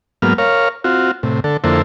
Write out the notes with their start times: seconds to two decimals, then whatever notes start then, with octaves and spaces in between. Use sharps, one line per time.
0.22 G#2 F#3 A#3 B3 F6
0.38 A#4 C#5 F5
0.84 C4 F4 F#4
1.23 A2 C3
1.44 D3 A4
1.64 F2 D3 A#3 E4 A4 C5